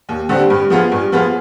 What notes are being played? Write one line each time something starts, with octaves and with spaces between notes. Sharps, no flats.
D#2
D3 G3 C4
G2
F3 B3 F4 G#4
G2
F3 B3 F4 G#4